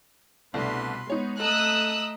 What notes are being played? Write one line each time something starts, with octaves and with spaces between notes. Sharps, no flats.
C2 B2 A3 D4 B4 C6
G#3 B3 D#4 C#5
A3 A4 D#5 A#5 D#6 E6 F#6